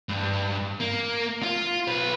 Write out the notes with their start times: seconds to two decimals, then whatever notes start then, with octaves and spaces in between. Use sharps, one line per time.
0.09 G2
0.80 A#3
1.43 F4
1.88 B1 B4